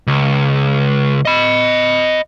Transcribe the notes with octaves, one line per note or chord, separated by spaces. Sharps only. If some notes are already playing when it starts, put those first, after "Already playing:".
C#2
D#5 B5